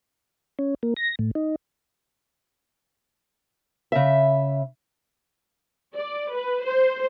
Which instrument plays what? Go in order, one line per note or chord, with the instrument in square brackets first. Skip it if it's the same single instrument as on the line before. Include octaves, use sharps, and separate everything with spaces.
[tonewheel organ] C#4
A#3
A#6
A2
D#4
[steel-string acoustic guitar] C#3 E5
[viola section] D5
B4
C5